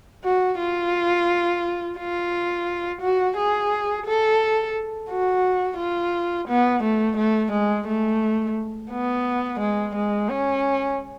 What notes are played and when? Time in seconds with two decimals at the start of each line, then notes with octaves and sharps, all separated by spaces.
0.24 F#4
0.59 F4
1.98 F4
3.01 F#4
3.37 G#4
4.06 A4
5.10 F#4
5.78 F4
6.48 B3
6.83 A3
7.17 A3
7.52 G#3
7.88 A3
8.92 B3
9.60 G#3
9.95 G#3
10.30 C#4